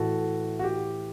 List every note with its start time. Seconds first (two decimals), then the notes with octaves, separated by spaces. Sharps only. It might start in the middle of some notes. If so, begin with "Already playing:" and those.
Already playing: A2 E3 F#4 A4
0.59 F#4
0.63 G4